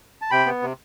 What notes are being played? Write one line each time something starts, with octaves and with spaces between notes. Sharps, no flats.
A5
C3 G5 B5
B3
C3